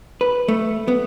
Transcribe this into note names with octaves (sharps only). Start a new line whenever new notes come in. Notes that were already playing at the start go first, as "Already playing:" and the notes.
B4
A3
B3